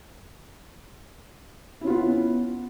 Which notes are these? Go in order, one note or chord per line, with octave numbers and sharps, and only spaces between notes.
B3 C#4 E4 F4